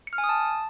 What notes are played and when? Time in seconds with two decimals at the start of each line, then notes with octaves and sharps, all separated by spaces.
0.07 C#7
0.13 F6
0.18 G#5
0.24 D#6
0.29 A5